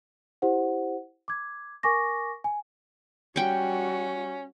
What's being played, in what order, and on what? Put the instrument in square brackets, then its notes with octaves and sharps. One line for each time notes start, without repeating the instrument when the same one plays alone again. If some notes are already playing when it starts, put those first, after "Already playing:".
[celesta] E4 G4 C5 F#5
D6 G#6
A#4 G#5 C#6 D6 A#6
G#5
[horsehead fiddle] G3 F#4 [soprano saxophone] C#4 [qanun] G5 C#6